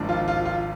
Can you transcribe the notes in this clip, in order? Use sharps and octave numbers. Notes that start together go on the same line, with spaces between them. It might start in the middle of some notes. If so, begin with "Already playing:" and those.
Already playing: G#1 G#2 F3 A#3 D4
F4
F4
F4